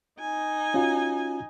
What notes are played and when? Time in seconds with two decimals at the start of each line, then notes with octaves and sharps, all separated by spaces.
0.20 D#4 G#5
0.74 C#4 F4 F#4